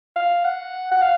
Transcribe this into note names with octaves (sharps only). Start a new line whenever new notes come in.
F5
F#5
F#5
F5